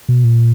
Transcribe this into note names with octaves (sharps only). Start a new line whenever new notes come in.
B2
A#2